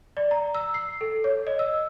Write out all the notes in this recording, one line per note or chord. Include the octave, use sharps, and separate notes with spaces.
D5
A#5
E6
C7
A4
C#5
D#5
E6